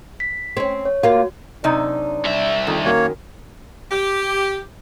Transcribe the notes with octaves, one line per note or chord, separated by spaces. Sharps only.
B6
C4 C#4
C#5
A#3 F4 F#4
F#2 C3 D4 D#4
G3 E5
F2 D#3
F#2 A#3 C#5
G4